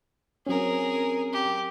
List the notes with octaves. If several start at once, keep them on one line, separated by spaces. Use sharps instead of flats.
F#3 C4 C#4 G#4 A#4
G4